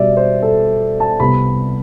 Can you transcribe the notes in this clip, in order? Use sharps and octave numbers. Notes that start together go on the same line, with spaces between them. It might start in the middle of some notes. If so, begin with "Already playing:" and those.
Already playing: B2 G3 B3 D5 E5
C5
A4
A5
C2 C3 G3 B3 B5